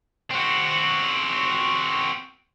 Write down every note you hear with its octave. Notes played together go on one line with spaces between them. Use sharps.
C4 F#4